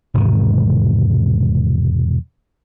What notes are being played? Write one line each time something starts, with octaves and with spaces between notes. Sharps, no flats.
E1 G#2 C3 D#3